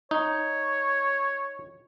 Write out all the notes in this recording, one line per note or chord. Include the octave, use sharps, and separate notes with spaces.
D#4 C#5